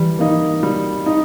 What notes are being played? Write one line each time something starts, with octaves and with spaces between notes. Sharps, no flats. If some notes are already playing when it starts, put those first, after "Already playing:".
Already playing: E3 G3
A#3 D#4
G3
D#4